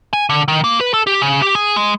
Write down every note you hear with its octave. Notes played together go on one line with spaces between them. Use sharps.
G#5
D3
D#3
A#3
B4
A4
G4
C#3
G4
G#4
G#3